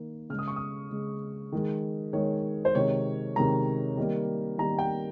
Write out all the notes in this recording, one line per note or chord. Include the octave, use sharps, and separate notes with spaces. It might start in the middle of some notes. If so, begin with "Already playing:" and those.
Already playing: D#3 A#3
C#3 G#3 F6
D#6
C#6
D#6
C#3 G#3
D#3 G#3
D#3 G#3 C#5
C5
C3 D#3 G#3 C#5
C3 D#3 G#3 A#5
D#3 G3 A#3
D#3 G3 A#3 A#5
G5